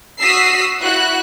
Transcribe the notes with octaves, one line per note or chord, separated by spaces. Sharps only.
F#4 D#6 E6 B6 C7
E4 F#4 F#6